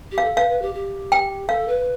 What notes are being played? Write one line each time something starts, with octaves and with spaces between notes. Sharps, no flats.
G4
F5
A4
B4 F5
B4
G4
G4
G5
A4 F5
B4